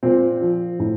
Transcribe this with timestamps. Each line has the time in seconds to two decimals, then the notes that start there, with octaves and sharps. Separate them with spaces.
0.03 A#2 C4
0.41 F3
0.79 A2